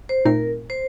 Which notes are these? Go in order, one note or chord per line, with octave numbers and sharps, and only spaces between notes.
C5
A#2 A3 C4 D#4 A#4
C5